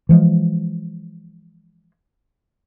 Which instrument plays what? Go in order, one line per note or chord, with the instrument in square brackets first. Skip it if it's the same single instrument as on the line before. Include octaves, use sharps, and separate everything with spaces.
[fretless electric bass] E3 F3 G#3